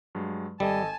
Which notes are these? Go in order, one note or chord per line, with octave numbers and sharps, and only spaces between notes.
G2 F#3 G#3
G#1 G3 A4 D#5 G#5 A5